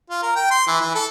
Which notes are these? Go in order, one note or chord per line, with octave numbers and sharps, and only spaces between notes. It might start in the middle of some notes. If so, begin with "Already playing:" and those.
F4
A#4
G5
C6
E3
E3
A4